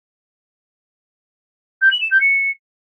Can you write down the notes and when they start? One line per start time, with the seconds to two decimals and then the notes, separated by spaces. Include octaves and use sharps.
1.81 G6
1.91 F#7
2.01 E7
2.11 G6
2.21 C#7